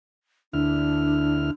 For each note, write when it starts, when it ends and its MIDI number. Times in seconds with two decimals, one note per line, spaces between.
0.53 1.51 38
0.53 1.52 62
0.53 1.51 64
0.53 1.51 89